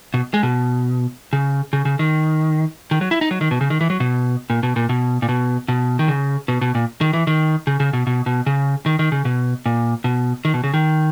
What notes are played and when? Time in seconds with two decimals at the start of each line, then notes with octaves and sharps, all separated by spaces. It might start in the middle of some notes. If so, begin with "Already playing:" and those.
0.14 B2
0.34 G#3
0.43 B2
1.33 C#3
1.73 C#3
1.85 C#3
1.99 D#3
2.91 D#3
3.01 F#3
3.11 E4
3.21 D#4
3.31 F#3
3.41 D#3
3.51 B2
3.61 C#3
3.70 D#3
3.81 E3
3.90 F#3
4.00 B2
4.50 A#2
4.63 B2
4.76 A#2
4.89 B2
5.22 A#2
5.29 B2
5.68 B2
5.99 D#3
6.08 C#3
6.48 B2
6.61 B2
6.75 A#2
7.01 D#3
7.13 E3
7.27 D#3
7.67 C#3
7.80 C#3
7.93 B2
8.07 B2
8.26 B2
8.46 C#3
8.86 D#3
8.99 D#3
9.12 C#3
9.25 B2
9.66 A#2
10.04 B2
10.45 D#3
10.54 B2
10.64 C#3
10.74 D#3